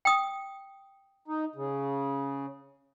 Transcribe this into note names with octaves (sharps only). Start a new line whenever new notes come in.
G5 D#6
D#4
C#3